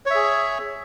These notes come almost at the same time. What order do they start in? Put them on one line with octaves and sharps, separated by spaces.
C#5 E5 G#4